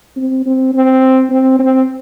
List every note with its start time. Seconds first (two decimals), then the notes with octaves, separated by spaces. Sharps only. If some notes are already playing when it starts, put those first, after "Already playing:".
0.17 C4
0.46 C4
0.74 C4
1.30 C4
1.59 C4